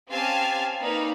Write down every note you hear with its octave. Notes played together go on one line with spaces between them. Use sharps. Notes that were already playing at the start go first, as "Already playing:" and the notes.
C4 C#4 G4 F5 G#5 A5
A#3 D#4 B4 D5 F5